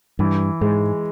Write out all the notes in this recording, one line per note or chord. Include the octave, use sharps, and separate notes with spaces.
G2 E3
G#2 G#3